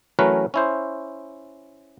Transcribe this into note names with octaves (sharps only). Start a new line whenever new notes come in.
E3 F#3 A3 C#4 A#4 B4
C#4 E4 C5